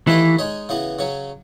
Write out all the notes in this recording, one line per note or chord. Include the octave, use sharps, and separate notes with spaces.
D#2 D#3 E3 A3 E4 B4
G#3 D#4 G#4 C#5
C#3 E3 B3 F#4
C#3 F#3 C#4